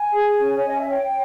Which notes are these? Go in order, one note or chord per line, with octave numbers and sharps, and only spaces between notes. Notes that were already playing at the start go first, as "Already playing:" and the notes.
Already playing: G#5
G#4
C#4
C#5
C#4 D#5
E5
C#5 G5